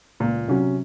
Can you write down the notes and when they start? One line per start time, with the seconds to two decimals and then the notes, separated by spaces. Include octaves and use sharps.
0.20 C#2 A#2
0.48 C3 F#3 C#4 F#4